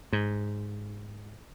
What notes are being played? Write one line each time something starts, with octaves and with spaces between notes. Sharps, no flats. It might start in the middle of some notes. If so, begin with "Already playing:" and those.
G#2